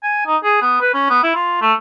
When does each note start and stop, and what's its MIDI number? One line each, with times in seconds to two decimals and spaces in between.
0.03 0.25 80
0.26 0.37 63
0.44 0.57 68
0.62 0.78 59
0.81 0.94 71
0.94 1.06 61
1.10 1.21 59
1.23 1.32 64
1.35 1.59 65
1.61 1.73 57